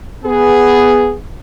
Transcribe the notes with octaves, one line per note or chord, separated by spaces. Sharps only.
B3 G#4